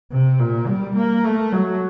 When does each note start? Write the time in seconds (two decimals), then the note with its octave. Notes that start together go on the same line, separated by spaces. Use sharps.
0.12 C3
0.40 A#2
0.67 G3
0.96 A#3
1.24 A3
1.53 F#3